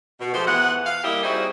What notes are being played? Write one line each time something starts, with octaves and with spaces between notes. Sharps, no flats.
B2
F3 G#3 A3 G4 C5
E2 E3 B3 F#5
F5
G3 A#3 E4 G4 D#5 E5
G3 C4 D#4 E4 F#4 G#4